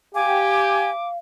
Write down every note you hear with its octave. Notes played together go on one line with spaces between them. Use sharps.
G4 F5 G#5 D6